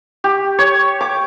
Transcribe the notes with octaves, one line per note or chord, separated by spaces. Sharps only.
G4
C#5
D6